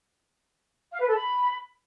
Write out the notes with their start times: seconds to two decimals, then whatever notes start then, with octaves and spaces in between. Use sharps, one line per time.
0.92 F5
1.00 B4
1.08 A4
1.16 B5